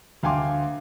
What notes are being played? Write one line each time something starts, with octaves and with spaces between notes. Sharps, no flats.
D2 F5 G5 G#5 C6 D6